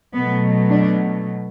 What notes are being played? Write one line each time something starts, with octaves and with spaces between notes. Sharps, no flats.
B2 F#3 A3 B3
D4